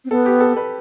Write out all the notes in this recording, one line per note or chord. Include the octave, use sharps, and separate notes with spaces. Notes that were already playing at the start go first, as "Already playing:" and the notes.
C4
B3 A4
G4
A4
B4